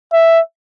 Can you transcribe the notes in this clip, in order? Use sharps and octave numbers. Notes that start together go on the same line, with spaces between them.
E5